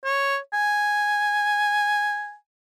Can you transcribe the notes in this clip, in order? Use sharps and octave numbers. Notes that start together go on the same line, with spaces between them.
C#5
G#5